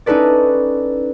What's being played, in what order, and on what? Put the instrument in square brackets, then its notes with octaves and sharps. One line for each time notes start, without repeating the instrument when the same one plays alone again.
[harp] C#4 D#4 E4 A4 B4 D5